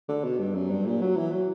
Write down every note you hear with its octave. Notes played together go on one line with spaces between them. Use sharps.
D3
B2
G2
F#2
G2
A#2
F#3
E3
F#3